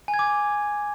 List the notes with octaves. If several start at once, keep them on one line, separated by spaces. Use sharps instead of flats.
G#5
G#6
D6